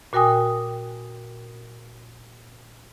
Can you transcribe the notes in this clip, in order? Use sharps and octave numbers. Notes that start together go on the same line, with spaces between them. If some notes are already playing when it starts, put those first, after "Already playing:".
A#2 F#4 A#4 G5 G#5 D#6